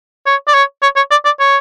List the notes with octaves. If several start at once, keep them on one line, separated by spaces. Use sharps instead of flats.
C#5
D5
C#5
C#5
C#5
D5
D5
C#5